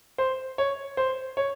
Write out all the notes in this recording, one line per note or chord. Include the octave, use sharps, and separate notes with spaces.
C5
C#5
C5
C#5